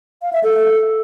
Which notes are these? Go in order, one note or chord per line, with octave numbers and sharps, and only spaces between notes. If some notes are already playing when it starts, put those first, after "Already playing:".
F5
E5
A4